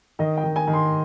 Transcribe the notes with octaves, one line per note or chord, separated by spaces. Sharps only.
D#3 D#5
G5
D#3
G#5
D#3
C6